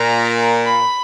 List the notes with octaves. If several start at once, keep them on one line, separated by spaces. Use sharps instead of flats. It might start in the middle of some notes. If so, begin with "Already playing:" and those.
Already playing: A#2 A#5
B5